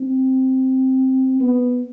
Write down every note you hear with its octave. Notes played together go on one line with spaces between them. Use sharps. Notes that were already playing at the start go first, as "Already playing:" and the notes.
Already playing: C4
B3